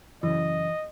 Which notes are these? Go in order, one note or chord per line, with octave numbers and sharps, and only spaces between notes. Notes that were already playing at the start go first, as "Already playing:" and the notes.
F#2 C#3 E3 D#5